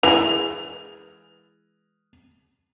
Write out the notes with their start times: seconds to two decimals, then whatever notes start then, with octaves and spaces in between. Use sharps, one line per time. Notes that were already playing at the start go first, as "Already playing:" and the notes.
0.03 E3 G#3 F7